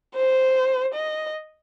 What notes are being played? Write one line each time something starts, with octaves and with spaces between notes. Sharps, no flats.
C5
D#5